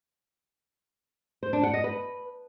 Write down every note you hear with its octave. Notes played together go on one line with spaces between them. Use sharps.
C5
D4
F#5
D#5
B4